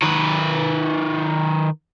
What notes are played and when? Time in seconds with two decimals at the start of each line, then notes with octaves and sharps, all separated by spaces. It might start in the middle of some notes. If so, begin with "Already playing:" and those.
0.02 D#3 B4